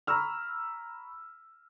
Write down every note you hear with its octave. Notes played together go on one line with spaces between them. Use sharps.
A#5 B5 C#6 E6 F6